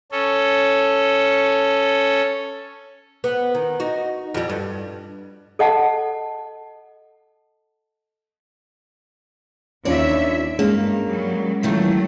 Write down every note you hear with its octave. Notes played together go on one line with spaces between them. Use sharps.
C#4 A4
B3
D#3
D#4 F#4
F2 G3
G2
A4 D#5 F#5 A5
D#2 C#4 D4 F4 C#5 D5 E5
G2 G#3 A#3 C#4
F#3 G3
A#2 D#3 E3 F#3 A3